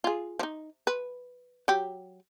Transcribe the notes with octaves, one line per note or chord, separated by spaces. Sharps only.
F4 G#4
F3 D#4
B4
F#3 G4